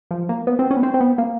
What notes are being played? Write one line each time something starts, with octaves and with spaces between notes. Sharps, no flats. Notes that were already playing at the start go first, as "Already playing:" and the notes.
F3
A#3
B3
C4
C#4
B3
C4
C4
B3
A#3